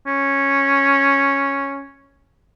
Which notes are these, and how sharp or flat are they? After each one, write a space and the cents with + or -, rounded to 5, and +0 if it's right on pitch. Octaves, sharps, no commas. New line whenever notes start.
C#4 -5